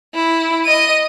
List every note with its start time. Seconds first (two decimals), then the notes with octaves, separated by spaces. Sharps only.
0.14 E4
0.65 D#5 D#7